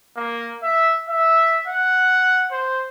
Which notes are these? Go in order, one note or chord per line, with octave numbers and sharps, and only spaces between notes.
A#3
E5
E5
F#5
C5